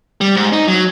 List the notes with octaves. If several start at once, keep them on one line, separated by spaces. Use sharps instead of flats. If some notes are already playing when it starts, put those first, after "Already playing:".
G3
G#2
D#4
F#3